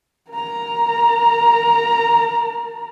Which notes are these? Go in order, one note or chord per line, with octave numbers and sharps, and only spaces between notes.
A#4 A#5